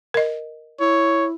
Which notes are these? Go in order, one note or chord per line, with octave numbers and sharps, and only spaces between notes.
A#4 D#5
E4 C#5